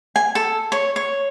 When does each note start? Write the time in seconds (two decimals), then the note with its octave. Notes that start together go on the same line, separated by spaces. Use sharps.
0.16 G#5
0.35 A4
0.72 C#5
0.96 C#5